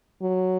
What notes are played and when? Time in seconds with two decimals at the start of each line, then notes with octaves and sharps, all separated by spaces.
0.22 F#3